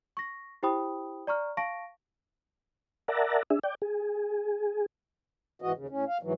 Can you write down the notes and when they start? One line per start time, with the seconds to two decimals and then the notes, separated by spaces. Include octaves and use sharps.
0.17 C#6 A#6
0.63 E4 G4 C5 G5 B5 D#6
1.27 D5 A#5 C#6 F6
1.57 F5 A5 C#6 A#6 D7
3.08 A#4 D5 E5 F#5 A5 A#5
3.50 D4 G#4 E5
3.63 D5 G5
3.82 G#4
5.62 E2 G#2 E3 F#4 D#5
5.75 D#2 C#3
5.89 A2 C#4
6.08 F5
6.23 G#2 E3 F#3